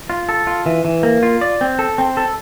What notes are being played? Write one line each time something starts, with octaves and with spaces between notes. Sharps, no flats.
F4
A4
F4
E3
E3
A#3
F4
D5
C4
A4
C4
A4